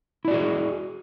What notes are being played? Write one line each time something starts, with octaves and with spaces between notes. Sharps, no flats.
E4 F#4 G#4 D5